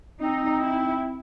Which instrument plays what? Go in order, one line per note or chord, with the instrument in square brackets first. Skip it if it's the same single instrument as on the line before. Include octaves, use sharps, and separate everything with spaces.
[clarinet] C4 [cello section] D#4
[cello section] E4